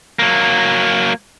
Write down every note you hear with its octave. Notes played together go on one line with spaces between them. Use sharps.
F#3 A#3